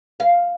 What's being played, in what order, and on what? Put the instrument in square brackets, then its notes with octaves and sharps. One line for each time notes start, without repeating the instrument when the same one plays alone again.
[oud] F5